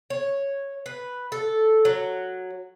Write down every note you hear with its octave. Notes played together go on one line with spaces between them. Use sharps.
C#5
B4
A4
F#3